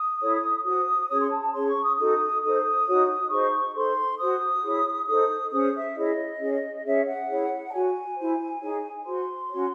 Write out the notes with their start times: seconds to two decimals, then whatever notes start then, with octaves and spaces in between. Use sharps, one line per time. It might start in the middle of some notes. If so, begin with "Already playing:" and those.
Already playing: D#6
0.20 E4 A4 C#5
0.64 F#4 C5 D#6
1.09 C#4 G#4 C#5 D#6
1.20 C6
1.31 A5
1.42 A5
1.53 C#4 G#4 C#5 C6
1.67 C#6
1.82 D#6
1.97 D#4 F#4 A4 D#6
2.41 D#4 A4 C5 D#6
2.86 D#4 F#4 C#5
3.30 D#4 G#4 C5 C#6
3.74 D#4 A4 C5 C6
4.18 F#4 C5 D#6
4.63 E4 G#4 C#5
5.07 D#4 A4 C5 D#6
5.51 C#4 G#4 C5 D#6
5.73 E5
5.95 E4 G#4 C#5 D#5
6.39 C#4 G#4 C#5
6.84 C#4 G#4 C#5 E5
7.06 F#5
7.28 E4 G#4 C#5
7.66 A5
7.72 F#4 C#5 G#5
8.16 E4 C5
8.61 D#4 G#4 C#5
9.05 F#4 C5 C6
9.50 C#4 F#4 C#5